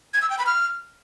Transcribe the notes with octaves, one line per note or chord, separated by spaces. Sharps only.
G#6
E6
G5
B5
F6